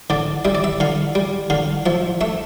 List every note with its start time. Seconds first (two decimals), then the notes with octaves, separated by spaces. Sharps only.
0.10 D3 D5
0.45 G3 E5
0.55 D5
0.64 E5
0.80 D3 F5
1.15 G3
1.50 D3 F5
1.86 F3 E5
2.21 A3 E5